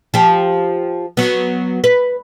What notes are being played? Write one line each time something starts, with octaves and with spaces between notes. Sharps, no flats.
F3 G4
F#3 B3
B4